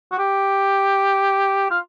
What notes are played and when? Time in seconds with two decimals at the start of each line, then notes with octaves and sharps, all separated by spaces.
0.12 F#4
0.19 G4
1.70 F4